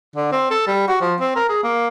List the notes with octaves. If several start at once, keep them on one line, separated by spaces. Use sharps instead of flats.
D3
C4
A4
G3
F#4
F3
C4
A#4
G#4
A#3